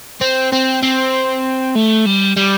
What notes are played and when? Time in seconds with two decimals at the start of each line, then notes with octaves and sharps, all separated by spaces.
0.21 C4
0.53 C4
0.83 C4
1.76 A3
2.06 G3
2.37 G3